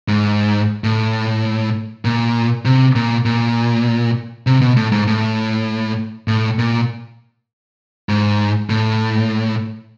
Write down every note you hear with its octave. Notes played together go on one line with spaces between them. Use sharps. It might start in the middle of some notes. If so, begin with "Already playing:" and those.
G#2
A2
A#2
C3
A#2
A#2
C3
B2
A2
G#2
A2
A2
A#2
G#2
A2